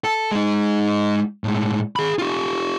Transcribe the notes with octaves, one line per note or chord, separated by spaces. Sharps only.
A4
G#3 D#4
A2 G#3
G#4 B5
F4 G4